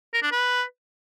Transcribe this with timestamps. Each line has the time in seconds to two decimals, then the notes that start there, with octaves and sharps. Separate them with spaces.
0.13 A#4
0.23 D4
0.32 B4